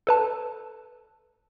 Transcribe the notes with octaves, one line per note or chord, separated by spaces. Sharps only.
A4 B4 A5